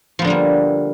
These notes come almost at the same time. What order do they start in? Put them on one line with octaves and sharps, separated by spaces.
F3 B3 D3 G3 A#3